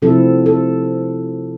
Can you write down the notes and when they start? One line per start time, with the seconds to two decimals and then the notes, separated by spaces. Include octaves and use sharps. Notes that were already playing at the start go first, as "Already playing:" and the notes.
0.02 C3 F3 C4 E4 A4
0.46 A4